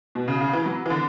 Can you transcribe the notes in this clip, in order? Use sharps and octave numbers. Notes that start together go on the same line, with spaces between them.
B2
C#3
C#3
E3
F#3
E3
D3